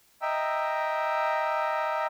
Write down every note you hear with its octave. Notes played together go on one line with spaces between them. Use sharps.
D#5 E5 G5 A#5 E6